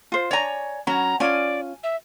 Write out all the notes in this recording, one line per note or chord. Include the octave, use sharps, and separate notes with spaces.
F4 C5
C#5 D5 G#5 A#5
F#3 C#4 A#5 B5
C#4 F4 D5 G#5
E5